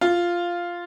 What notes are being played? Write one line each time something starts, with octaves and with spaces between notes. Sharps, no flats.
F4